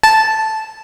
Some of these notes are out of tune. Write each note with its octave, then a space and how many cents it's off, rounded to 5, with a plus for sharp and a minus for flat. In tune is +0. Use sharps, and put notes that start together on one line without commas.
A5 -5